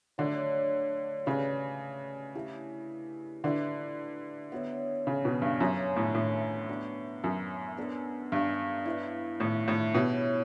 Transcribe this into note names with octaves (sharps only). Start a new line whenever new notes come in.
D3 F#3 A3 D4
C#3 G3 D4 F#4 B4
A3 E4 G4
D3 E4 G4 B4 E5
B3 F#4 C#5 E5
C#3
B2
G2
F#2 D4 G4 C#5 E5
A2
A2
B3 D4 F#4
F#2
B3 D4 A4
G2
E4 B4 D5
A2
A2
B2 E4 G4 C#5